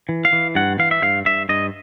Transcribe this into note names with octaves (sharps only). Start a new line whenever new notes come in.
E3
F5
E3
G2 F#5
E3 F5
E5
G2 F5
G2 E5
G2 D#5